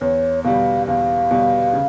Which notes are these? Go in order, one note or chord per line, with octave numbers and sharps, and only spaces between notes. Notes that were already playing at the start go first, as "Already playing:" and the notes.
E2 C#5
B2 G3 F5
E2 F5
B2 G3
C#3